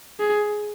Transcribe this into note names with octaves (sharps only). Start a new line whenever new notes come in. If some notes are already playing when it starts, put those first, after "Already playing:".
G#4